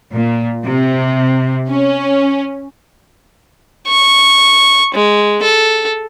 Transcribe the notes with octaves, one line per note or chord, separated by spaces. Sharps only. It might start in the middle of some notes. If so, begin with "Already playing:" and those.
A#2
C3
C#4
C#6
G#3
A4